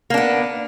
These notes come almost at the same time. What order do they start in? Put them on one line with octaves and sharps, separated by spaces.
A#3 D4 B3